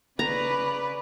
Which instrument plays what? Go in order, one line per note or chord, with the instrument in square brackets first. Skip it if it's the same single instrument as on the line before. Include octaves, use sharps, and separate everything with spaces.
[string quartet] C#3 B4 D5 [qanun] A#5